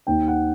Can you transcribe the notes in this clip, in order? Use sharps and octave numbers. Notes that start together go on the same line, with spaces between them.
D#2 D#3 G5
F#5